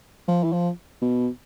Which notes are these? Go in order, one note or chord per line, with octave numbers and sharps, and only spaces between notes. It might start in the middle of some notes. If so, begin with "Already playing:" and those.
F3
E3
F3
B2